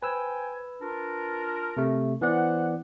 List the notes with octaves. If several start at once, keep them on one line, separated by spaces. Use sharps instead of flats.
B4 C5 G5 G#5 E6
D4 F4 A#4
C3 A3
E3 B3 C5 D5 F#5